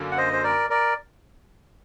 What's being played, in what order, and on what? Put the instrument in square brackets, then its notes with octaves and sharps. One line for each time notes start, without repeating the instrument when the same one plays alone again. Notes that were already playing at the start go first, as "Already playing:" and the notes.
Already playing: [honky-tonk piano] F#2 D3 A#3
[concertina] F#5
C5 D#5
C5
A#4 D5
A#4 D5